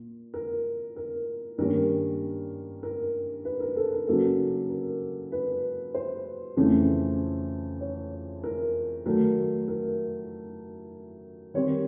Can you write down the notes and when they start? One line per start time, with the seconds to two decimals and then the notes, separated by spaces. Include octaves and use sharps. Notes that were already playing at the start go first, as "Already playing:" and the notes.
Already playing: A#2
0.34 A#4
0.96 A#4
1.58 G2 D#3 G3 A#3 C#4 A#4
2.83 A#4
3.45 B4
3.60 A#4
3.76 A4
3.92 A#4
4.07 C#3 F#3 A#3 D#4 A4
4.70 A#4
5.32 B4
5.94 C5
6.56 F2 C#3 E3 A3 C#4
7.81 C#5
8.44 A#4
9.06 D#3 F#3 A3 A#4
9.68 A#4
11.54 D#3 G3 C4 C#5